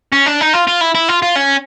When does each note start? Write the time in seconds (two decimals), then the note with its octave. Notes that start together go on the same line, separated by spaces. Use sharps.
0.13 C#4
0.26 D4
0.41 D#4
0.54 F4
0.68 F4
0.81 E4
0.95 E4
1.09 F4
1.23 F4
1.36 C#4